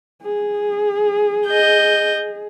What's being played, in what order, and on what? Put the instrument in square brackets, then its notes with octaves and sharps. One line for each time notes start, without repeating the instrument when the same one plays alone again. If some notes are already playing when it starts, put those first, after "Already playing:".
[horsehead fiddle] G#4
[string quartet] D#5 G6